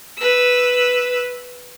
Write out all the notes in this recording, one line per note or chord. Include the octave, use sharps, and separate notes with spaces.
B4 E6